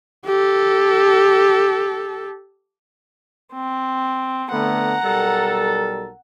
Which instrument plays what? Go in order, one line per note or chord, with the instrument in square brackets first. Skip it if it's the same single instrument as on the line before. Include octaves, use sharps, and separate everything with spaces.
[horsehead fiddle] G4 A4
[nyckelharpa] C4
[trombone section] D3 A3 B3 [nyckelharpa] F#5 A#5
[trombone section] B1 G3 A#4 [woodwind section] A4